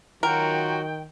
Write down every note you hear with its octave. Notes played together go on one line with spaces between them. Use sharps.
D#3 F#3 F4 F#4 A#4 G5